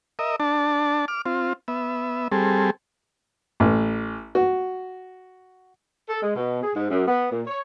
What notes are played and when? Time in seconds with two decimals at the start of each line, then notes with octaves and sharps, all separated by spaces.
0.19 A#4 D#5 E5
0.40 D4 A5
1.08 D6 F6
1.26 C4 F4
1.68 B3 E5
2.32 G3 C4 G#4 A4
3.60 A1
4.35 F#4
6.09 A4
6.22 G#3
6.36 B2
6.63 G#4
6.76 G#2
6.91 F#2
7.08 B3
7.32 A#2
7.47 C#5